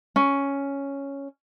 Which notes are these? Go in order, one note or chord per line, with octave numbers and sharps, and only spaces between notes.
C#4